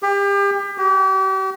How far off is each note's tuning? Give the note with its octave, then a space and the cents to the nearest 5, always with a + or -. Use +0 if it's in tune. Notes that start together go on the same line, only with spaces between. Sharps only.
G4 +35
G4 -40